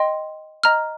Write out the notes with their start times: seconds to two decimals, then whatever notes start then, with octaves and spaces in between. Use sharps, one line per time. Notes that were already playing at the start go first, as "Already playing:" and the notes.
Already playing: D#5 G5 C6
0.63 D#5 A#5 F6